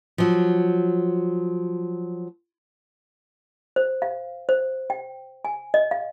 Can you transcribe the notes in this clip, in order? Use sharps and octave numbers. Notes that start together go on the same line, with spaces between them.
F3 F#3
C5
F5
C5
G5
G#5
D#5
F5